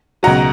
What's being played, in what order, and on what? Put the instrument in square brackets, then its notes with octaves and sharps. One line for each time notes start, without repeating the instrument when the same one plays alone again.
[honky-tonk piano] C#2 B2 F#3 F#5 A#5